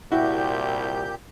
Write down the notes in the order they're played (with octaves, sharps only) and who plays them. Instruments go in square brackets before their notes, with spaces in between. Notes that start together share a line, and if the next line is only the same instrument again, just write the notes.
[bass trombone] C2 [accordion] A#2 G4 G6 [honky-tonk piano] E4 [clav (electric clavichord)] F#4